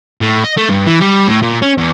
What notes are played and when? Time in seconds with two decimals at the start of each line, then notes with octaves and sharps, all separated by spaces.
0.21 A2
0.44 D#5
0.57 A3
0.69 G2
0.86 E3
1.00 G3
1.27 A2
1.43 A#2
1.62 C#4
1.78 E2